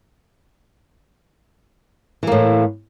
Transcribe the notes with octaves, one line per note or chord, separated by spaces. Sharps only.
A2 E3 A#3